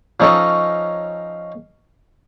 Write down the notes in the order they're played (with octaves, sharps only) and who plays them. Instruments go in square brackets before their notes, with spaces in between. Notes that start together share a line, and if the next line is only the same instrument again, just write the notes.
[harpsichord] F3 C#4 D#4 A4 C#5 D#5